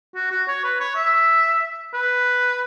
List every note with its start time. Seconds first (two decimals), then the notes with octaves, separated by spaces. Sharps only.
0.15 F#4
0.31 F#4
0.48 C#5
0.64 B4
0.80 C#5
0.96 E5
1.94 B4